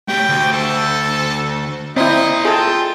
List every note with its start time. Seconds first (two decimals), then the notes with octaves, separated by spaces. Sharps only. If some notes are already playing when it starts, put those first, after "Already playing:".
0.08 A3 G4 G5
0.29 D2
0.53 A4
1.96 C4 E4 D5 D#5 A#5
2.45 F4 G#4 A4 G5